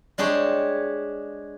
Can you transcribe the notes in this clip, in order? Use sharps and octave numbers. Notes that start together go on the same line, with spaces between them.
G#3 D4 G4 G#4 C#5